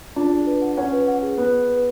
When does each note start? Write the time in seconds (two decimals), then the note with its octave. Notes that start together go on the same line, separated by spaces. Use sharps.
0.16 D4 F4
0.31 G#4
0.47 B4
0.62 F#5
0.77 C#4 F#5
0.92 B4
1.08 F#5
1.23 G#4
1.38 B3 B4
1.54 F#5
1.69 B4